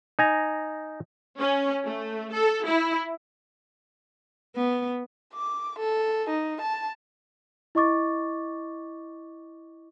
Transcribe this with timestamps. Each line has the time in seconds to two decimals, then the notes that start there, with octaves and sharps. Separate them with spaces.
0.19 D#4 G#5 A#5
1.39 C#4
1.85 A3
2.32 A4
2.66 E4
4.56 B3
5.33 D6
5.79 A4
6.29 D#4
6.61 A5
7.75 E4 D#5 C#6 D6 A6